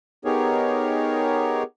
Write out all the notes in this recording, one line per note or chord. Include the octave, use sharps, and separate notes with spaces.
B3 D#4 G4 G#4 A#4 C#5